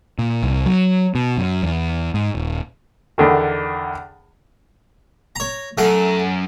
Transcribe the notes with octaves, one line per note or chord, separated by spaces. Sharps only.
A#2
C2
F#3
B2
F#2
E2
G#2
D#1
E2 D3 D#3
C#5 A#5
F#2 A3 F#5